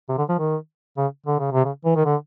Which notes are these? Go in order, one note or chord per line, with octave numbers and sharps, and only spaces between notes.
C3
D3
F3
D#3
C#3
D3
C#3
C3
C#3
E3
D#3
D3